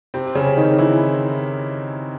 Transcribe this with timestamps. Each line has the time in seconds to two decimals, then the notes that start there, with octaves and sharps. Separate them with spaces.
0.14 C3 C4
0.35 C#3 C#4
0.57 D#3 D#4
0.78 E3 E4